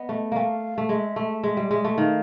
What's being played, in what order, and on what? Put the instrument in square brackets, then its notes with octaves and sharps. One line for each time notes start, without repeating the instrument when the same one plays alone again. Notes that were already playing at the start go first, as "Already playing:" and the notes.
Already playing: [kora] B3 [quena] D#5
[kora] A3
[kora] A3 A#3 [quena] G#5
[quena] F5
[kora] A3
[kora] G#3 [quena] E5
[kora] A3
G#3
G3
G#3
A3
[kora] D#3 [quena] F5